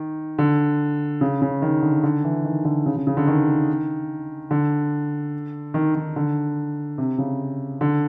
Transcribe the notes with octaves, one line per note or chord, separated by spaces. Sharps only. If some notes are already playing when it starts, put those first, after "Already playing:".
Already playing: D#3
D3
C#3
C#3
D#3
D3
D3
E3
D#3
D3
C#3
C#3
C#3
D3
D#3
D3
D#3
D#3
D3
C3
C#3
D3